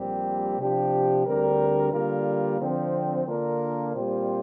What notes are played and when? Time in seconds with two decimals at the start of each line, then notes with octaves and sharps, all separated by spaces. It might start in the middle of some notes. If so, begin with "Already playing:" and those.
Already playing: A#1 A#2 G3 C4 G4
0.58 C3 F3 D4 G4
1.25 D2 D3 G3 C4 A#4
1.92 D3 G3 A#3 F4 A#4
2.58 D3 F3 C4
3.25 D3 A#3 D4 F4 A#4
3.93 A#2 G3 C4 F4 C5